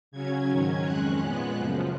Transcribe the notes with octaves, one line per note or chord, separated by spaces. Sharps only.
C#3 F#3 C#4 G#6
G#2 D#3 F#3 C#4
F2 D#3 G#3 C#4 F#6
A#2 G#3 B3
F#2 C#3 F3